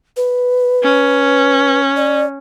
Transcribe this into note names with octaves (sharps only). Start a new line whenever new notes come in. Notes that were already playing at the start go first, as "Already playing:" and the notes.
B4
C#4
D5